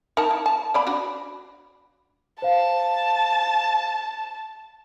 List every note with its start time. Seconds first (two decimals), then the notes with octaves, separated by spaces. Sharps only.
0.17 D#4 A#4 A5
0.31 E4
0.46 A5
0.74 B3 D5 B5
0.87 D4 F#4
2.42 C5 F5 A5